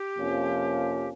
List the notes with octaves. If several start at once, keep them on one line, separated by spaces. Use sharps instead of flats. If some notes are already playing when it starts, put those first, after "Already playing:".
Already playing: G4
F2 C3 F3 A#3 C#4